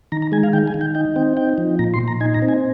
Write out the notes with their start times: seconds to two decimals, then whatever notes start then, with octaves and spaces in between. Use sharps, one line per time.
0.12 D#3 A#5
0.22 A#5
0.32 G#3 G#5
0.44 F5
0.53 D#3 G5
0.68 G#5
0.74 D#3
0.81 G5
0.95 D#4 G5
1.16 C4 G5
1.37 D#4 G5
1.58 F3
1.79 A#2 A#5
1.94 C6
2.00 A#2
2.08 A#5
2.20 D#4 G#5
2.34 A#5
2.42 C4
2.48 G#5